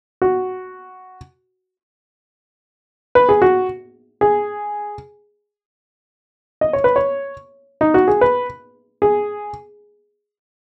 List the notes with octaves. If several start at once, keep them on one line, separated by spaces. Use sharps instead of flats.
F#4
B4
G#4
F#4
G#4
D#5
C#5
B4
C#5
D#4
F#4
G#4
B4
G#4